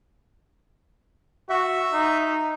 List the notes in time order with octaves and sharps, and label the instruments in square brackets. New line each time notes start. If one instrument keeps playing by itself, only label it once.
[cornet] F#4 [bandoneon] E5
[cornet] D#4